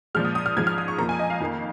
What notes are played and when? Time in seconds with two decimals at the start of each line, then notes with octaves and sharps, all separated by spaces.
0.15 A#2 F3 G#3 F6
0.24 D#6
0.35 D#6
0.46 F6
0.57 G#2 F3 G#3 G#6
0.67 F6
0.78 D#6
0.88 C#6
0.98 F2 F3 A#3 A#5
1.09 G#5
1.19 D#5
1.30 F5
1.40 F2 D#3 A#3